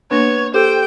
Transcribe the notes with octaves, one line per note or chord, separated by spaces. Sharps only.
A#3 B3 D4 C#5
G4 A4 C5 G5